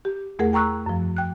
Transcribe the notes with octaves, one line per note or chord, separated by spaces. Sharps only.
G4
E2 A3 G#4 A#4 F#5
G5 A#5 C#6 E6 F#6
F#2 F3
G5 F#6